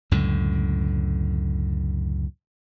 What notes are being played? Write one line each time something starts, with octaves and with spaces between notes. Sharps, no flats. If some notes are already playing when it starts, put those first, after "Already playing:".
C#2 F#2 A2 D3